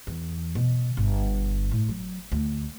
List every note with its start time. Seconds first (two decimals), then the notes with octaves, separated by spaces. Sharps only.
0.07 E2
0.55 B2
0.97 G1
1.71 A2
1.89 F#3
2.32 D2